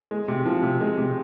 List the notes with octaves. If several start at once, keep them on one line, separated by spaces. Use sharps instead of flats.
G#3
C3
F3
C3
G#3
C3